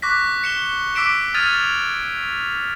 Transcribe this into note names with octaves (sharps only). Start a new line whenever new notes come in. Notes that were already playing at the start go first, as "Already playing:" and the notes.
C#6 D6 F#6 A#6 B6
C#7 E7 G7
D6 E6 B6 C#7 D7 E7
D#6 F6 G#6 A6 D#7 F7